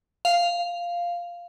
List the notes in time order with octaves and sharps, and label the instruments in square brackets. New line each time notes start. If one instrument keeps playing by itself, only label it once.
[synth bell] F5